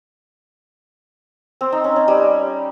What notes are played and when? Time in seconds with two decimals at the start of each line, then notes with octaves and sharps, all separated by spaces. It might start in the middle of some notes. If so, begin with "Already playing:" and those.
1.61 C4
1.72 D#4
1.84 C#4
1.96 C#4
2.08 G3